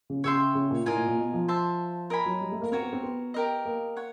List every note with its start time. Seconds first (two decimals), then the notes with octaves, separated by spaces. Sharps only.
0.10 C#3
0.24 C#3 C#5 E5 G5 C6
0.55 C#3
0.71 A#2
0.86 A2 F4 A#4 D#5 G#5
0.97 A#2
1.07 A#2
1.17 B2
1.33 F3
1.48 C5 E5 A5
2.10 A#4 D#5 G#5 B5
2.26 F#3
2.41 G3
2.52 A3
2.61 A#3
2.72 C4 F#4 A#4 C#5
2.83 B3
2.93 C4
3.03 B3
3.34 G4 A#4 D#5
3.65 A#3
3.97 C#5 F#5